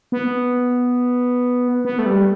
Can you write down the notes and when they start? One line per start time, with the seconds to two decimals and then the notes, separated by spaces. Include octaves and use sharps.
0.12 B3
1.85 B3
1.99 A3
2.06 G3